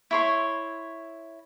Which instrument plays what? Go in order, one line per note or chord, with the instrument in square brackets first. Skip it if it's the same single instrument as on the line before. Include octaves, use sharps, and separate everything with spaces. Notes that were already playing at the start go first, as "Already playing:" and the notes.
[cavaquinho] E4 C#5 C6